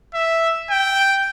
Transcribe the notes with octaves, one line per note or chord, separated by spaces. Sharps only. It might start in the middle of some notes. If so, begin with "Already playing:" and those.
E5
G5